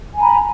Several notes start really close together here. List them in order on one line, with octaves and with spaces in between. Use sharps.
G#5 B5 A#5